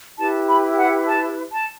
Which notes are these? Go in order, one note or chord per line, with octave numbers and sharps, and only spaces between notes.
E4 G4 B4 A5
B5
F#5
A5
A5